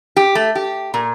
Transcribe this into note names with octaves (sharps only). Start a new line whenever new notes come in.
G4
A3
G4
A#2